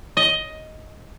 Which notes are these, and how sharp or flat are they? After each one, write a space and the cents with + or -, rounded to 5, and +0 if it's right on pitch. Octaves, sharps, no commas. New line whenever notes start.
D#5 +10